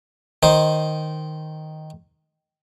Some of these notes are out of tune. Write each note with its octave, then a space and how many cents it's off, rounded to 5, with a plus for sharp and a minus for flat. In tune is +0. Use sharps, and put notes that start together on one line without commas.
D#3 +0 D#4 +0 C5 +0